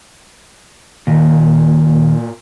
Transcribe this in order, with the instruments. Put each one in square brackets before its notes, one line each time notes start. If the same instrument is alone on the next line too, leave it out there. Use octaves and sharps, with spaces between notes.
[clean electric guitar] D#2 [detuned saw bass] A#2